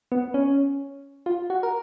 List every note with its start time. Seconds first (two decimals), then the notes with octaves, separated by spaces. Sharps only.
0.12 B3
0.34 C#4
1.26 F4
1.50 F#4
1.63 A#4